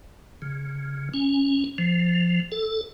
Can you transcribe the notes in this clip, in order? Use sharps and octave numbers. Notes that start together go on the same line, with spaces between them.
C#3
C#4
F3
A4